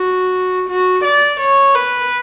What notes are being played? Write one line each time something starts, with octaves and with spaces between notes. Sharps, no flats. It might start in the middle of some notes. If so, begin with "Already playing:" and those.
Already playing: F#4
F#4
D5
C#5
B4